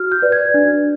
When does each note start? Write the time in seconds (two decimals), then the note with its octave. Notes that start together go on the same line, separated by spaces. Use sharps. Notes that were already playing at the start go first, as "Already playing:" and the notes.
Already playing: F#4 F6
0.12 G6
0.22 B4 D5
0.32 G#6
0.54 D4